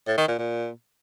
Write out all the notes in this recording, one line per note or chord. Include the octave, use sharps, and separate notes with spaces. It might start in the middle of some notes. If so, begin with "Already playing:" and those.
A2
D#3
A#2
A#2